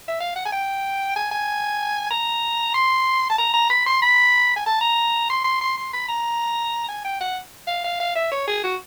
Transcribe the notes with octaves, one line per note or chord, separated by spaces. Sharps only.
E5
F5
F#5
G#5
G5
G#5
G#5
A#5
C6
A5
A#5
A#5
B5
C6
B5
G#5
A5
A#5
C6
C6
C6
C6
B5
A#5
G#5
G5
F#5
F5
F5
F5
E5
C#5
G#4
F#4